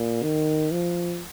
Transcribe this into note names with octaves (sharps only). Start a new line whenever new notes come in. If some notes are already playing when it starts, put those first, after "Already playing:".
Already playing: A#2
D#3
F3